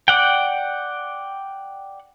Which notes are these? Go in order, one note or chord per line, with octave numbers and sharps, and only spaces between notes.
D5 F#5 G5